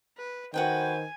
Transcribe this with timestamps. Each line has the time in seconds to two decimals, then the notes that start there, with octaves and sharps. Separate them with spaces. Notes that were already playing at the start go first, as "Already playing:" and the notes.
0.18 B4
0.54 D#3 F#4 B4 C5 G5 G#5